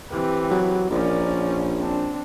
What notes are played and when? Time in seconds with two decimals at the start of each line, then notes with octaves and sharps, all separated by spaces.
0.11 E3 C4 G4 B4
0.51 F#3
0.90 A#1 F3 C#4 A#4 D5
1.79 C4 D4